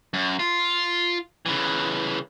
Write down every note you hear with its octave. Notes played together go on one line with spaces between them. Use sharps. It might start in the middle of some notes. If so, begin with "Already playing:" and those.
F#2
F4
C#3 E3